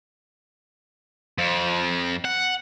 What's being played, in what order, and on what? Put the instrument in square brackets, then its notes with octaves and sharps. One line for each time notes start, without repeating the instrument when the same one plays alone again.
[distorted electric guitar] F2
F#5